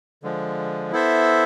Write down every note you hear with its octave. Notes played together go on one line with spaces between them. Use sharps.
D3 F3 G#3
B3 E4 A4 C5 E5